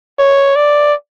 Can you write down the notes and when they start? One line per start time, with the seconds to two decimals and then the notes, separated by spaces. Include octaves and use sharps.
0.19 C#5
0.56 D5